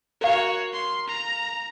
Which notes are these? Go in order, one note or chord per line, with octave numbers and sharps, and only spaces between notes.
F#4 A#4 C#5 F5
C6
A#5